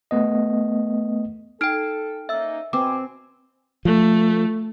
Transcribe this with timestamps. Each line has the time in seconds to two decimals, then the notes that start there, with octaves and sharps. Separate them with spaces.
0.11 A3 B3 D#5
1.61 D#4 A4 G5 F6 D7
2.29 A#3 C#4 D#4 E5 E6
2.73 B2 C4 B4 C5 G#5 D6
3.85 F3 A3